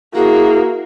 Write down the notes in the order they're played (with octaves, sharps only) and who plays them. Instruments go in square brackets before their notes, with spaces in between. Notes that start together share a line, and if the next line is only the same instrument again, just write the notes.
[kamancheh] A#3 [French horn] E4 [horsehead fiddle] F#4 [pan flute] G#4